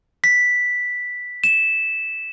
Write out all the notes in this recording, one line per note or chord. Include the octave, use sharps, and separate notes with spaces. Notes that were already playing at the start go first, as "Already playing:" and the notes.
B6
E7